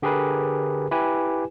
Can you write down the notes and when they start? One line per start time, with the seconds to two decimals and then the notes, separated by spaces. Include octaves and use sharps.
0.02 D3 G4 G#4 A#4 B4
0.91 E4 G4 B4 G#5